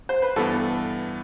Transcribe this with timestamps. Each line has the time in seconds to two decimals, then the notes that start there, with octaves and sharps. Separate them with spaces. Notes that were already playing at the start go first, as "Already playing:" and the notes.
0.09 C5
0.22 B4
0.36 G2 E3 B3 A4